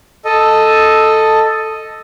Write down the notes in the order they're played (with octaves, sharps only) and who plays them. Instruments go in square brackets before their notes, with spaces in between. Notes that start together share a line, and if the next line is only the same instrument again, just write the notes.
[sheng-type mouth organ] A4 D#5